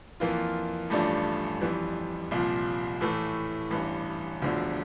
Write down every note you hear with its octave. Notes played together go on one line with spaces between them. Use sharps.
F2 E3 A#3 F4
A1 G2 F3 A3 D4
F2 E3 G3
C2 A#2 F3
A2 E3 A3
A1 G2 E3
E1 D2 D3 F3